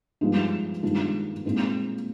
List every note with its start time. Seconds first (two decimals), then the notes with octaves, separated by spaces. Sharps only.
0.21 G2 F3 G#3 D#4
0.83 G2 D#3 G#3 D4 F4
1.45 A#2 G#3 C4 D#4